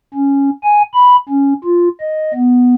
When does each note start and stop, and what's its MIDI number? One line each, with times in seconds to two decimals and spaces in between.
0.14 0.50 61
0.63 0.82 80
0.93 1.16 83
1.29 1.53 61
1.64 1.88 65
2.01 2.32 75
2.34 2.74 59